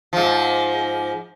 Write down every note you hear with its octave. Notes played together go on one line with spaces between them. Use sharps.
G#2 F3